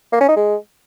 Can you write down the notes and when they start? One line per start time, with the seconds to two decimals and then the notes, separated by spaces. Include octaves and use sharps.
0.13 A#3
0.21 C#4
0.29 D#4
0.36 G#3